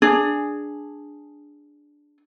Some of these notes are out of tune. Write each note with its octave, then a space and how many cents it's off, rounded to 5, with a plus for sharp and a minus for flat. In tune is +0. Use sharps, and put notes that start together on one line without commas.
D4 +0 G#4 +0